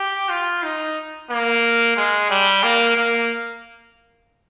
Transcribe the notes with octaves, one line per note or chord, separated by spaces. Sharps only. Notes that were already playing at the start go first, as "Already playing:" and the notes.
Already playing: G4
F4
D#4
A#3
G#3
G3
A#3
A#3